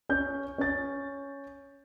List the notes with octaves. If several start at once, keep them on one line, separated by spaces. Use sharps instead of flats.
C#4 G6
C#4 A6